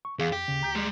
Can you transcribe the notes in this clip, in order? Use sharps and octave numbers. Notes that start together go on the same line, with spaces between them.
C#6
E2 G#4 F5
F2 G4
D#2 C#3
D2 A#5 G6
G3 G#3